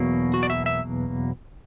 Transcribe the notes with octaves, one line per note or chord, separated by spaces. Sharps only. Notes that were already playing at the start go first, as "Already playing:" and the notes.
Already playing: E2 B2 F#3 A#3
F#4
D5
E5
E5